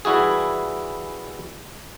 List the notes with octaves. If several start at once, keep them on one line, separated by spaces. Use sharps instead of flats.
E3 G3 E4 F#4 G#4